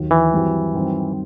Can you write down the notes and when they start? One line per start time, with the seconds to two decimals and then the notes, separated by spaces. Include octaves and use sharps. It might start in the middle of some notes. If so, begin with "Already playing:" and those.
Already playing: D#2 D#3 F#3
0.11 E3
0.33 G2 F#3 C4 E4 G4
0.74 G2 D#3 F#3 C4